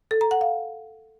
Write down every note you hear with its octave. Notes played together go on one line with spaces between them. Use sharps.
A4
A#5
F#5
F5